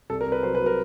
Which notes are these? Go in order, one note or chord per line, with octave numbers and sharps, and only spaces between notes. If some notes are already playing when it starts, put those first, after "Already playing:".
C2 A4
A#4
C2
B4
F#3 C5
B4
F#3
A#4